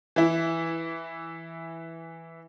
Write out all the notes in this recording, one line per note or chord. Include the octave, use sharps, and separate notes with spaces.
E3 E4